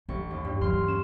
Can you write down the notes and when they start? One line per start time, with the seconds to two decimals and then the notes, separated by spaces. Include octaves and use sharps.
0.09 A1 F#2 C#6
0.31 D#2
0.45 G2
0.61 E3 F#3 C6 F6
0.87 C#4 E7